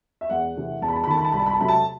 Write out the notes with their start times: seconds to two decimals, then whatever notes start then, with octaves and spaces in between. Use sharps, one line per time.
0.21 E5
0.30 E2 F#5
0.55 C3 E3 A3
0.81 E2 A5
0.88 B5
0.96 A5
1.04 B5
1.07 D#3 A3 A5
1.17 B5
1.25 A5
1.32 C2 B5
1.39 A5
1.46 B5
1.53 A5
1.60 C3 F#3 A3 B5
1.68 A5